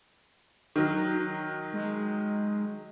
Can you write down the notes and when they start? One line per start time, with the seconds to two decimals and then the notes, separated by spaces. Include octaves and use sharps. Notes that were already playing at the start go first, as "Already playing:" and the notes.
0.76 D#3 F#3
1.74 G#3